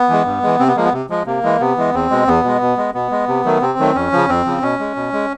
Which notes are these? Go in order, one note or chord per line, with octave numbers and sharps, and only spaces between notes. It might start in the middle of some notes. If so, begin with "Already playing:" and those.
Already playing: B3
E3 G#3
G2
E3 G#3
C3 C4
B3
F3 G#3 A#3
B3
C3
F3 G#3
C3 A#3
E3 G#3
C3 B3
E3 G#3
E2 C4
B2 G#3
E2 B3
B2 G#3
B2
G#3
B2 B3
G#3
C3
D#3 F#3 A3
C3 C4
D#3 F#3 A3
F2 C#4
C#3 F3
F2 C4
C#3 F3
B2 C#4
G#3
B2
G#3